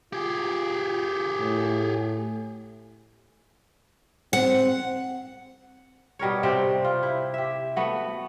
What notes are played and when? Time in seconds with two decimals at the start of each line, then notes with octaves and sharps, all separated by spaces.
0.13 F4 G4 G#4
1.39 A2
4.33 C4 F#5
6.19 B2 G3 A#4 C#5
6.43 C3 C4 G4
6.85 F4
7.03 E4
7.34 G4 E5
7.76 A3 B3 F#4